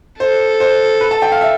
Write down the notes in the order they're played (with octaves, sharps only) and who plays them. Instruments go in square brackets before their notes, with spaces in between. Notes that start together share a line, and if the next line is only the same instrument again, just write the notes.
[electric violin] A4 [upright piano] C5
[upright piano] C5
B4
A5
G5
F5
E5